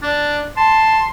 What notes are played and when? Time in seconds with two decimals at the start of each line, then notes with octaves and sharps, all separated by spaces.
0.03 D4 D5
0.57 A5 C6